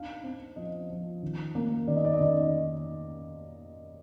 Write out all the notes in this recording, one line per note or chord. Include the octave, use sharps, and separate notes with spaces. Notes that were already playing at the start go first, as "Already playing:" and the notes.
Already playing: D4 D#4 F5
C4
F3 D#5
F3
D#3
A#3
D#3 D5
D#5
D5
D#5
D#3 D5